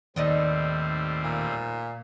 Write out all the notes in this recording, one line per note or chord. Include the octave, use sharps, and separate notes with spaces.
D#2 A2 G3 C4 D#4 D5 D#5
A#2